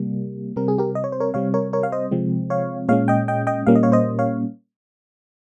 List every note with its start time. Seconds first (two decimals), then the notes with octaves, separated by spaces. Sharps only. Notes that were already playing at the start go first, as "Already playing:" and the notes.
Already playing: C3 G3 A#3
0.56 C3 G3 C4 A#4
0.68 G#4
0.78 G4 A#4
0.95 D#5
1.04 C#5
1.12 C5
1.20 A#4 C#5
1.34 C3 G3 C4 C#5 F5
1.54 A#4 C#5
1.73 A#4 C#5
1.83 F5
1.92 C5 D#5
2.11 C3 F3 G#3 C4
2.50 C#5 F5
2.89 A#2 G#3 C#4 C#5 F5
3.08 D#5 G5
3.28 D#5 G5
3.47 D#5 G5
3.67 A#2 G3 A#3 C#4 F5
3.75 D#5
3.83 C#5 F5
3.92 C5 D#5
4.19 C#5 F5